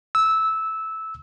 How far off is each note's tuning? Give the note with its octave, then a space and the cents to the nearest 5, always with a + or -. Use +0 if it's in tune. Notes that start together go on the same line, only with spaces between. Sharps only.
E6 -15